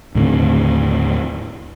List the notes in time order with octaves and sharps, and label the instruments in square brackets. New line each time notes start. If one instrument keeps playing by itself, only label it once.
[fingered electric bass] D#2 A2 D3 C4